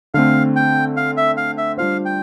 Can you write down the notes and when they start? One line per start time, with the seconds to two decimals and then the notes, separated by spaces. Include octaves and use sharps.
0.14 D3 A3 C4 F5
0.56 G5
0.97 F5
1.17 E5
1.37 F5
1.58 E5
1.78 G3 D4 F4 C5 F5
2.05 G5